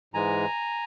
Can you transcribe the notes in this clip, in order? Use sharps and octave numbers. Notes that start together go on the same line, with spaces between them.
G#2 E3 G#3 G#5 A#5